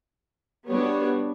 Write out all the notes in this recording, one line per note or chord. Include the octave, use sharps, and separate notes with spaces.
G3 B3 D4 F#4 C#5